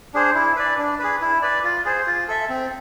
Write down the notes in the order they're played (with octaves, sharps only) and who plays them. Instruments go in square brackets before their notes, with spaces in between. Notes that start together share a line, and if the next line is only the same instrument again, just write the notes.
[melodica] D4 G#4 C5
E4
B4 D5
D4
G#4 B4
E4
B4 D5
F4
G#4 C5
F4
A4 E5
C4